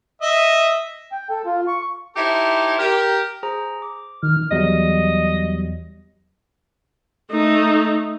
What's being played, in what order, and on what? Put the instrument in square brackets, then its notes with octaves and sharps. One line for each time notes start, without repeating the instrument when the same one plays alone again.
[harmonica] D#5 E5
[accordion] G5
A4
F4
C#6
[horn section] D#4 E4 G4 A4 C5
G4 A#4
[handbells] G#4 C5 A#5
D6
[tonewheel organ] D#3 [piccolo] F6
[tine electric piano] E2 F#3 G3 [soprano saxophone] D#5
[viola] A3 D#4